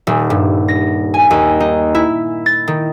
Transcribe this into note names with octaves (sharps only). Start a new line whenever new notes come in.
D#1
G2
A#6
G#5
D#2
D#4
E4
A6
D#3